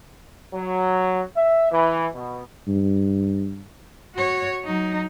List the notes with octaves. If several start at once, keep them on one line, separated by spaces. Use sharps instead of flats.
F#3
E5
E3
B2
G2
F#4 C#5
F#3 D#4